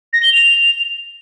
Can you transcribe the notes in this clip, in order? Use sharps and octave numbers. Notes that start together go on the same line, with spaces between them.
A#6
G7
F7